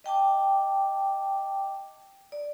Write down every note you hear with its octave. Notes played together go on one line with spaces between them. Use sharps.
D#5 G5 A5 D6
D5